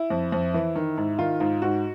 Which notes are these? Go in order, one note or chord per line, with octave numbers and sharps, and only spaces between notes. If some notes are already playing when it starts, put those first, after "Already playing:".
Already playing: E4
F2
F2
E3
D#3
G#2
D#3 F4
G#2 F4
G#2 F#4